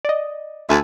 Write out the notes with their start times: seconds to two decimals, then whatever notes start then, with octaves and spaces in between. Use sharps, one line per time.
0.05 D5 D#5
0.69 D2 E5 G#5 A5